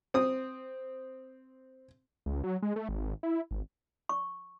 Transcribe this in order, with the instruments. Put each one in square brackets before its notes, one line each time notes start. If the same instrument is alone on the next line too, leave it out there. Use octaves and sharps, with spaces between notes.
[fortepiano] C4 D#6
[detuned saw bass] C#2
F#3
G#3
A3
G#1
E4
G#1
[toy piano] C#6